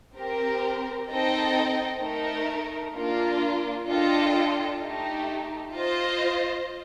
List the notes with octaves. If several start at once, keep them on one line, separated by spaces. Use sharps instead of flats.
C4 G4 A#4
C4 D#4 A4 D#5 G5
A3 D#4 A#4
A#3 D4 F4 A#4
D4 F4 A4 D#5 G5
A3 D#4 G4
F4 C5 D#5